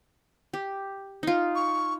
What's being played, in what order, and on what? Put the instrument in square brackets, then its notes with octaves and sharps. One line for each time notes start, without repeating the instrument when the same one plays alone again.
[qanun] G4
D#4 F4
[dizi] C#6